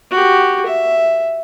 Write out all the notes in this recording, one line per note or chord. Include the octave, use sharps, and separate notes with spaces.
F#4 G4
E5